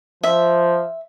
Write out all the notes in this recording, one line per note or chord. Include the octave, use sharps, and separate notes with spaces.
F3 E5